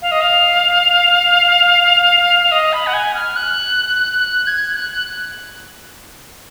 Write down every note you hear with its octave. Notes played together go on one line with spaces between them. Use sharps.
F5
D#5
F5
F5
D#5
B5
F#5
G#5
F6
F#6
F#6
G#6
F#6